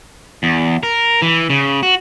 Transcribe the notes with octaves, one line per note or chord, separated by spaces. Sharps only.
E2
A#4
E3
C#3
F#4